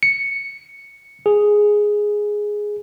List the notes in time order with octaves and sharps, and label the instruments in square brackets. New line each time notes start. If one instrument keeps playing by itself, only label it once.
[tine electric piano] C#7
G#4